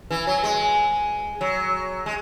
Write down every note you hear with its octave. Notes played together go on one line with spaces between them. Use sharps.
E3
F#3
G#3
F#3
G#3